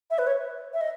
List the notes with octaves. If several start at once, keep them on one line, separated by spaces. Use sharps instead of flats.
E5
B4
C#5
E5
D#5